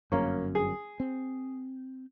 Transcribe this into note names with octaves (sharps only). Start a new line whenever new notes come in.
G1 F#2 A#3 C#4
G#4
C4